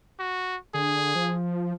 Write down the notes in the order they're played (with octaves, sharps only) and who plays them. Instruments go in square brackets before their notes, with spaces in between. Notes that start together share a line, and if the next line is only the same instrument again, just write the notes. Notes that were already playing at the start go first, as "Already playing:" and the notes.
[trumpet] F#4
[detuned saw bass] D3 [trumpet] G#4
[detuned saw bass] F3